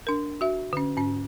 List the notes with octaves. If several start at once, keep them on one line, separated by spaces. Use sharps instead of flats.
D4 A#4
F#4 E5
D3 C#4
G#2 C#4